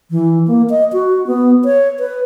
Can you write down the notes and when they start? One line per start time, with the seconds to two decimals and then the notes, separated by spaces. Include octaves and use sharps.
0.11 E3
0.47 A#3
0.70 D#5
0.93 F#4
1.27 B3
1.65 C#5
1.99 B4